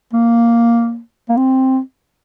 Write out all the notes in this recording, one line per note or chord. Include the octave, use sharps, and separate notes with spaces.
A#3
A#3
C4